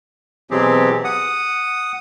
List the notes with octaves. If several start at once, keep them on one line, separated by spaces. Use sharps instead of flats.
B2 E3 F#3 C4 G4 G#4
F#5 D#6